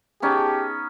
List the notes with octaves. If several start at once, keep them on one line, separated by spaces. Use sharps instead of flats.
B3 C#4 D#4 G4 G#4 A5